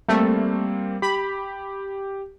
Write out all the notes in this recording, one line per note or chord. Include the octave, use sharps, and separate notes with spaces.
G3 A3 A#3 C4
G4 B5